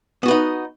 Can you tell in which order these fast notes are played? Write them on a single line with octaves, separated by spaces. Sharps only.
B3 F#4 B4 D#4